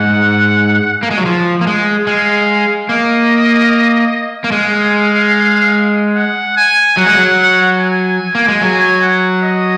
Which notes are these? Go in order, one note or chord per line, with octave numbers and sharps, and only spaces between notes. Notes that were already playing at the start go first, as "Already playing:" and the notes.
Already playing: G#2 F#5
A#3
G#3
F#3
F3
A#3
G#3
G#3 F5
A#3 D#5
A#3
G#3 F5
F#5
G#5
F#3 F#5
G#3
F#3
G#5
A#3
G#3
F#3 G#5
F#5
D#5